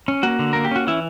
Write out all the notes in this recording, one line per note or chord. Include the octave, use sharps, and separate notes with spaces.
C#4
A#3 F#4
D3
A#3 A#4
G4
C#4 F#4
E3 E4